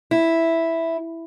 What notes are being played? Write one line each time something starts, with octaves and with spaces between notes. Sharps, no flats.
E4